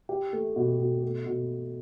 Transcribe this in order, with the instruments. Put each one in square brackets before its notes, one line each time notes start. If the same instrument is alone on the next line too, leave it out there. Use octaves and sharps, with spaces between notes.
[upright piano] G4
A3
B2
B2
A3
B2